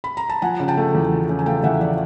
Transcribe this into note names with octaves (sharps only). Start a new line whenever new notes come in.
B5
A#5
A5
F3 F#5 G#5
C#3
G5 A5
A3
E2
F3
C#3
G#5
A3 F5 G5
E2 E5 F#5
F3 D5 E5